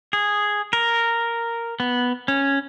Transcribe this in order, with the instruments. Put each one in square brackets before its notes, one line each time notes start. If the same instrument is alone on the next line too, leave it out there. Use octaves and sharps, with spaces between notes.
[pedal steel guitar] G#4
A#4
B3
C#4